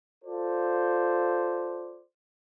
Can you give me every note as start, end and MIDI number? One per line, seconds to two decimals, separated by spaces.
0.24 2.02 65
0.24 2.02 69
0.24 2.02 72
0.24 2.02 74